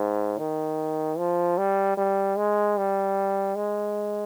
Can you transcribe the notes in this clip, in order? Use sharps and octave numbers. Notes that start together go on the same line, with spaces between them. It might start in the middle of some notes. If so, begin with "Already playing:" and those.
Already playing: G#2
D#3
F3
G3
G3
G#3
G3
G#3